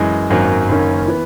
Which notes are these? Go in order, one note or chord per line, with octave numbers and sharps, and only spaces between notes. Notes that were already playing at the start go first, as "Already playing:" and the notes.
Already playing: F#2 E3 G#3
G#1 F#2 D#3 F#3 A#3
F#1 F#2 D#3 A#3 C#4
E3 B3